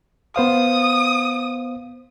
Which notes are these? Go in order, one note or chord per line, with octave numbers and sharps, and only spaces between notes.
B3 C5 F5 D#6